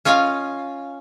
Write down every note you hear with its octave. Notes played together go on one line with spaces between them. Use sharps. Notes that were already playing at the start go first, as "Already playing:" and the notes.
C#4 F4 C#5 D#5 F5